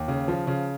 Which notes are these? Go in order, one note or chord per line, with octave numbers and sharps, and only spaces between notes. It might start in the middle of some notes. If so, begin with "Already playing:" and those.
Already playing: D#2
C#3
F3
C#3